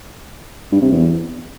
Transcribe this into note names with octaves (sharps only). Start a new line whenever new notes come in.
G2
C3
E2